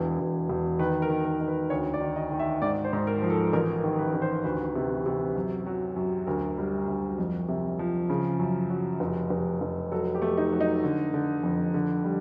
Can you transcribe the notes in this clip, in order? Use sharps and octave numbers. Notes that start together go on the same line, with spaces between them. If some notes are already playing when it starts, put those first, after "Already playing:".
Already playing: E1 E3
E1
E1
D#3 B4
A#4
D#3
A#4
D#3
B4
D2 C#5
D5
D#3
D#5
D#3
E5
G#2 D5
C5
G#2
A#4
F3
A4
A1 A#4
A#4
D#3
B4
A1
C5
D2 B4
C3
C3
F#2
F#3
F#2
D2 A#4
G3
D2
F2
C3
F3
C#3
F#2
F#3
F1
F1
F1
F#3 A4
G4
A3
D#4
F#3
D#4
D3
D3
F2
D3
G3